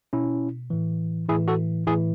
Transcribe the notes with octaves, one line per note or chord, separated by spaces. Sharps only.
B2 C#4 E4
A2 E3
A2 E3 E4 G#4
F#4 A4
A2 E3 E4 G#4